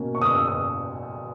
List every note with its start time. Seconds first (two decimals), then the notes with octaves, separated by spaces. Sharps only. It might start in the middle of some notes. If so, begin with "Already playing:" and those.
Already playing: B2 A#3 C#4
0.15 C#6
0.22 D#6
0.35 E6
0.47 D#6